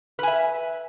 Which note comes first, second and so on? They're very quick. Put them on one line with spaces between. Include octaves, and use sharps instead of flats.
B4 G#5 E5